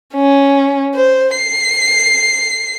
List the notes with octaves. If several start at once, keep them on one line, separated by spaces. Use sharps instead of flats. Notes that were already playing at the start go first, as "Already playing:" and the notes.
C#4
C5
C7